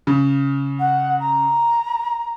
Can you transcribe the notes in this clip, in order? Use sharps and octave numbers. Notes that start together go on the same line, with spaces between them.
C#3
F#5
A#5